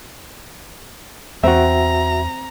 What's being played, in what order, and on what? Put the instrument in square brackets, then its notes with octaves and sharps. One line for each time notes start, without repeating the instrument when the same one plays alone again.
[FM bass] E2 [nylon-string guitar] C4 [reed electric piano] F#4 E5 [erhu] A#5